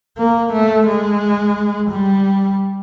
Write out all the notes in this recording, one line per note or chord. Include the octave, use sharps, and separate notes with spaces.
A#3
A3
G#3
G3